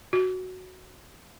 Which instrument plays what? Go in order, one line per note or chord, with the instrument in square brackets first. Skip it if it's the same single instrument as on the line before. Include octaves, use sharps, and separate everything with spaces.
[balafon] F#4